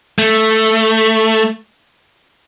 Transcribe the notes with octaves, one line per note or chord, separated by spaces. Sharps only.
A3